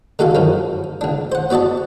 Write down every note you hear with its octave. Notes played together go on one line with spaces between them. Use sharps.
D3 G#3 F#4 A4 F5
F#2 D#3 F3
C#2 D4
C5 F#5
B3 F#4 D5 D#5 A5